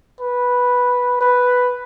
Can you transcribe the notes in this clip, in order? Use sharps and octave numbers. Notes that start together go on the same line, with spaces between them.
B4
B4